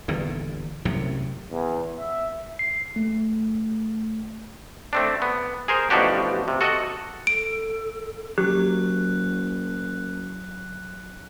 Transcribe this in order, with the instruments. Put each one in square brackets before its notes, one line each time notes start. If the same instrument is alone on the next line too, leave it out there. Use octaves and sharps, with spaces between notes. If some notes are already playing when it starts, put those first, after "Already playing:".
[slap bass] G1 E2 G2 A#2
C2 F#2 A2 C3
[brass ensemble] E2
E5
[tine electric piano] C7
A3
[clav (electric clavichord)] A3 C4 D4
B3
G#4 A#4 C5
A1 B2 F3 D4 F#4 G4
C3
F#4 A4 D#5 F#5
[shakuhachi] A4 [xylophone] D7
[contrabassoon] F#1 [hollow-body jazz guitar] F#3 [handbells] G4 [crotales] F#6